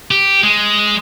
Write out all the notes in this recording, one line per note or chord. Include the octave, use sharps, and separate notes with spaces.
G4
G#3